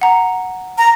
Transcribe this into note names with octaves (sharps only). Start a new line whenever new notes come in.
F#5 A#5
A#5